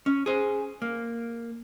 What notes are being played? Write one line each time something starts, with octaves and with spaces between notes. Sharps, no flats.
C#4
G#4 C5
A#3